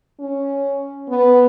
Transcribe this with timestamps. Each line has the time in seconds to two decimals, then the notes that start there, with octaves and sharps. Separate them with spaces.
0.20 C#4
1.09 B3